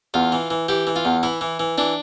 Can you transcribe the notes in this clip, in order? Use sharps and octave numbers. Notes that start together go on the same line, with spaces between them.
E2 F4
E3
E3
E3 G4
E3
F4
E2
E3 E4
E3
E3
E3 D4